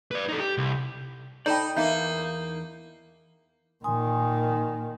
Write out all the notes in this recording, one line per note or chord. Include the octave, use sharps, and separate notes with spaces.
B4 D5
D#4 A4
G4
C2
D#4 A4 C5 D5 G5 A5 B5 G6
E2 A#3 D#4 E5 F5 G6
A#2 D#3 G#5 C6 D#6